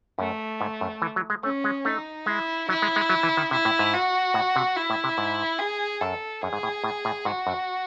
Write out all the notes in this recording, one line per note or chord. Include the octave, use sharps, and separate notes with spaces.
F#2 A3
G#2
F#2
E3
F#3
G#3
A3 C#4
G#3
A3 D#4
G#3 E4
F#3 E4
G#3
G#3
F#3
E3
D#3
C3 E4
A2
G#2
F#4
A2
C3
E4
A2
C3
G#2
G#4
F#2 A4
F#2 G#4
G#2
A2
A2
A2
G#2 F#4
F#2